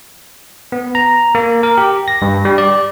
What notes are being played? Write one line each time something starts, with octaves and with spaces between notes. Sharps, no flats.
B3
A#5
A#3
A#4
G4
A#6
G2
G3
D5